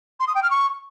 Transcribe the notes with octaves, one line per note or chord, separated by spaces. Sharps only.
C6
D#6
G5
F6
C#6